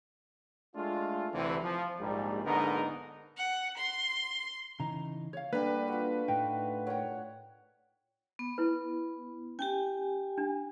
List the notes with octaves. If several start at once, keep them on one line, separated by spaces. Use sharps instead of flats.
G#3 A3 D4 F4
D2 C3 E3
F3
A#1 G#2 G3
A#1 G#2 D3 B3 D#4 A#4
F#5
C6
C#3 E3 D#4 A#5
C#5 F5
D3 G3 A#3 D4 B4
F4 F#4
A2 D#4 G5
A#4 C#5 F#5 G5
B3
E4 B4
C#4 G4 G5 G#5
D4